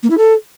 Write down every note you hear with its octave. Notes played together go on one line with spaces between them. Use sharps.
A#3
E4
A4